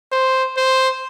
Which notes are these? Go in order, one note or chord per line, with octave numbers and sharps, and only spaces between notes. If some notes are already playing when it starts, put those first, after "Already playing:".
C5
C5